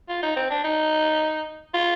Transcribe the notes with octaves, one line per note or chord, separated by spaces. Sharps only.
F4
D#4
C4
D4
D#4
F4